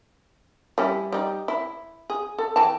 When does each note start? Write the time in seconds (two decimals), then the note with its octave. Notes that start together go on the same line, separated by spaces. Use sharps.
0.78 G3 C#4 E4
1.13 G3 D#4
1.48 E4
2.10 G#4
2.39 A4
2.56 E3 G5 A5